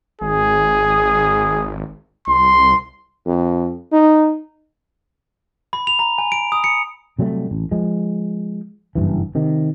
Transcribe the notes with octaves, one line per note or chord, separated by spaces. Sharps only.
G#1 G#4
C2 C6
F2
D#4
B5
F7
A#5
G#5
D7
D#6
C#7
C3 F#3 G3 A3
A1
F3 G#3
F#1 B1 G2 E3
C3 D#3